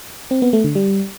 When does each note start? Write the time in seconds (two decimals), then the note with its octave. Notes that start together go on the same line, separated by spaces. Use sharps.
0.31 C4
0.42 B3
0.53 A3
0.64 D3
0.75 G3